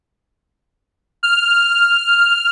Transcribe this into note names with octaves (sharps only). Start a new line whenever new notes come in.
F6